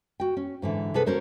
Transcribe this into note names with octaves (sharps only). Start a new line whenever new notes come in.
F#4 G5
C#4
G#2 D3 E3
C3 G#4 A4 B4
C#4 F#4 A#4 C5 C#5